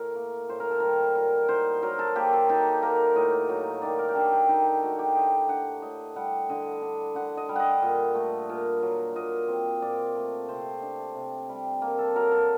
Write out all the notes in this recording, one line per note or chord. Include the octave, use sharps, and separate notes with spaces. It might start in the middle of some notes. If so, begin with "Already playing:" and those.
Already playing: A2 A#4
A#3
A2 C5
A#4
A4
G3 A#4
F#3 A#4
D#4 C5
F#3 A#4
A4
A#3 G4
A4
D#4 A4
A#3 A#4
A2 D#5
F#3
D#3 D5
A#4
G4
D4 A4
G4
D#3 D#4
A3 F#4
G4
A2 D#5
D4 F#5
A2 D#5
G3 F#5
D3 D#5
D4
D3 F#5
D#5
G3
D#5 F#5
A#2
A3
A#2
F#3
A#2 D#5
C4
A#2 D5
A3
C3 C5
D4
C3
G3
A#3
A4
F#3 A#4
A4